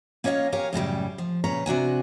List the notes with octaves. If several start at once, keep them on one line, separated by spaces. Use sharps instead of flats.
A#3 C#4 C#5 D#5 F5
G4 A#4 C#5 F5 G#5
F#2 A2 C#3 G3
F3
A#2 C#3 B4 C#5 A#5
C3 D4 F#4 G#5